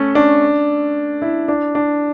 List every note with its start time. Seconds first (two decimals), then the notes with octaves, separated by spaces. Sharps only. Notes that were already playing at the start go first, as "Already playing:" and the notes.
Already playing: A3 C#4
0.15 D4
1.22 E4
1.48 D4
1.75 D4